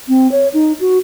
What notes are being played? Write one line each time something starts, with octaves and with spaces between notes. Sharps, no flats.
C4
C#5
D#4
F#4